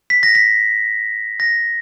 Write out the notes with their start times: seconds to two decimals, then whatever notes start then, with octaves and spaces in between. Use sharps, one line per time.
0.10 B6
0.23 A#6
0.35 B6
1.40 A#6